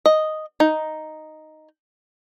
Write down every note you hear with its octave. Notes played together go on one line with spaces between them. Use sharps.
D#5
D#4